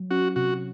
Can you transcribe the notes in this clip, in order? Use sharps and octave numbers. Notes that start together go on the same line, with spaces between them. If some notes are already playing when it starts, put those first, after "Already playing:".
Already playing: F#3
C#4 F#4
C3 F#4